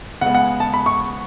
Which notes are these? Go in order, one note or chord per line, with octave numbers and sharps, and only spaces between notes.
C#3 G#3 B3 F#5
F#5
A5
B5
C#6